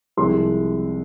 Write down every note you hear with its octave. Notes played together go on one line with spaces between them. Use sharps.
C2 C3 F3 G#3 C6